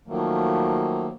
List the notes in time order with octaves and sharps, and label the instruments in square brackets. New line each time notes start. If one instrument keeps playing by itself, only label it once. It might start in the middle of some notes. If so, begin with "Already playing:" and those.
[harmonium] D#3 F3 F#3 A3 A#3